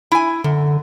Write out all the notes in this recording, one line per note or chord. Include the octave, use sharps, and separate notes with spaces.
E4 G#5
F#2 D3